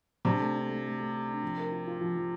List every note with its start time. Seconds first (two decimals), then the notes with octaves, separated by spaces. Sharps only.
0.25 C3 D4
0.39 A3
0.54 D4
0.69 A3
0.84 A3
0.99 A3
1.13 G4
1.28 D4
1.42 F3
1.57 A#4
1.71 F4
1.87 F4
2.01 F3
2.16 F3